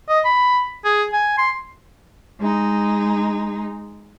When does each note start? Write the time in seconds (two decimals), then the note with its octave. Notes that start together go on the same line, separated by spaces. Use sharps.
0.09 D#5
0.25 B5
0.85 G#4
1.13 G#5
1.38 C6
2.39 G#3 D#4